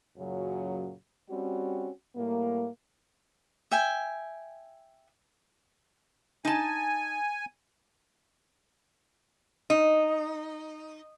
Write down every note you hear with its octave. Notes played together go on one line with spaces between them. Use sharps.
F#2 A#2 C#3 F#3
G3 C4 C#4 F#4
A2 G3 A#3
E5 G5 G#5
D#4 G#5 A5
D#4